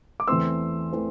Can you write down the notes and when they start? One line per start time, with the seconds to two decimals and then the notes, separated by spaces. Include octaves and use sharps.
0.20 D6
0.28 E2 E3 A3 C4 C6 E6
0.93 E3 A3 C4